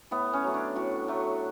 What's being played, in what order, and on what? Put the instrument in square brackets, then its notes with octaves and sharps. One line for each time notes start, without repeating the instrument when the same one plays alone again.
[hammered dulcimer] A2 B3
C#4
F#3 A3
D4
A2 F#4
F#3 A3